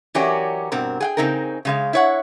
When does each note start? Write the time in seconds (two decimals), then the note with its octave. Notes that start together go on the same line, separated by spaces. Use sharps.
0.15 E3 F#3 C#4 G4 A#4 D5
0.72 G2 B2 C4 A#4
1.00 G#4 F#5 G5
1.17 C#3 C4 D#4 G#4 A#4
1.65 C#3 G#3 F5
1.93 E4 C#5 F#5